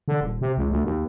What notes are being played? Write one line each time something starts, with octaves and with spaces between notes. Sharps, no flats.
D3
D#1
C3
C#2
D2
D#2